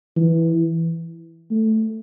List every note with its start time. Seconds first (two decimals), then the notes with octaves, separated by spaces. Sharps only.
0.17 E3
1.51 A3